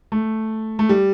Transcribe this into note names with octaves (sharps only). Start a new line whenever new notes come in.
A3
A3
G3